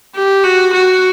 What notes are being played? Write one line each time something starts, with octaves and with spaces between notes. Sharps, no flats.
G4
F#4
F#4